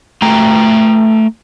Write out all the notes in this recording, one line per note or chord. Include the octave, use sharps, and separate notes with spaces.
A3 G5 A#5